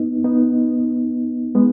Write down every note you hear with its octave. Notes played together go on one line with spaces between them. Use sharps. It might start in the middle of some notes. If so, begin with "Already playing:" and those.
Already playing: B3 D#4
B3 D#4
G#3 B3